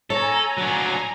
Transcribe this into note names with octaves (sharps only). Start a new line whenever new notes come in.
A4 C#5 G#5 A#5
F#3 D4